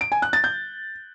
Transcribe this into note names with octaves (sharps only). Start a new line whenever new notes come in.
D7
G#5
F#6
A6
G6